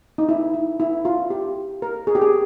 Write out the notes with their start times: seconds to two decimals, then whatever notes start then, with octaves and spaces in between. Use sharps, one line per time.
0.18 D#4
0.29 E4
0.54 E4
0.80 E4
1.05 F4
1.30 G4
1.82 A#4
2.07 G#4
2.15 G4
2.22 G#4